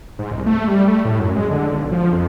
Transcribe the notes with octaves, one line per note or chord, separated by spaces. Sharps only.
G#2
C2
A3
G3
A3
A2
F#2
G#3
D3
B1
F3
F2